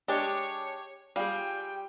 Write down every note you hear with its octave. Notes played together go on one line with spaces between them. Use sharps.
G#3 D4 G4 C#5 A5
G3 F4 G#4 G5